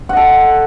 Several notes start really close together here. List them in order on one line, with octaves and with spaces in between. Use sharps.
F#5 D#5 A4